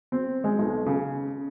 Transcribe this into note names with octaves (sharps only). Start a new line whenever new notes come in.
C4
G#3
B1
C#3